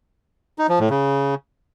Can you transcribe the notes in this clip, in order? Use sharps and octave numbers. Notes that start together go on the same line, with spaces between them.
D#4
F3
A2
C#3